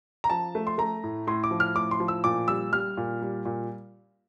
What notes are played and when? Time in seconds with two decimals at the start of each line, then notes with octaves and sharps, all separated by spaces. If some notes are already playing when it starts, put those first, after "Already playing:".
0.24 A#5
0.30 F3 A5
0.55 A3
0.67 C6
0.78 A3 A#5
1.03 A2
1.27 A2 C6
1.44 D6
1.51 F3
1.60 F6
1.75 A2 D6
1.91 C6
2.00 F3
2.08 E6
2.24 A#2 D6
2.48 G3 E6
2.72 G3 F6
2.97 A#2
3.22 G3
3.45 A#2